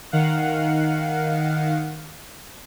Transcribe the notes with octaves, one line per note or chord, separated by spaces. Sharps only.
D#3 F5 F#5